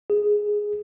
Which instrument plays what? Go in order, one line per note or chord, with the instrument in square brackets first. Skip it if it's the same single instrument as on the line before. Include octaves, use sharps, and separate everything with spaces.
[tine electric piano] G#4